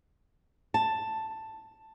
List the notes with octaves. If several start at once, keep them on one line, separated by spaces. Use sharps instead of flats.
A5